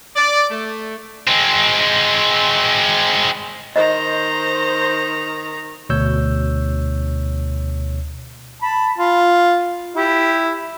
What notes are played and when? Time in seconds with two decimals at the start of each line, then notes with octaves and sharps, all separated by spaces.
0.16 D5
0.50 A3
1.27 G#3 C4
3.76 D#3 C5 D#5 A#5
5.89 D2 B2 C#5 E6 G6
8.62 A5 B5
8.98 F4
9.96 E4 G4